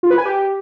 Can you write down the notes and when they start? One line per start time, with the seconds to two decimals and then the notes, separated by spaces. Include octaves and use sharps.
0.03 F4
0.11 B4
0.18 G#5
0.26 G4